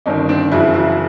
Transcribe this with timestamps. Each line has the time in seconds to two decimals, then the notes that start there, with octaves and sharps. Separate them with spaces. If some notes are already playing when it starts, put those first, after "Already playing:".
0.06 G1 G2 D#3 C#4 D#4
0.29 C4 D4
0.51 F#1 F#2 C#3 E3 E4 F#4
0.74 E4 F#4